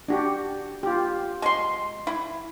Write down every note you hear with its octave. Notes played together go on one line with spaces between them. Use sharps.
D4 F#4 G4
F4 G4
G#3 C6
E4